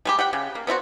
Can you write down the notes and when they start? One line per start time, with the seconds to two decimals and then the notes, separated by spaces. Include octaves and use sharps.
0.05 G3 G#3 G4
0.19 G4 F#5 G5
0.33 C#3
0.55 A#3
0.67 B3 C4 E4 F#4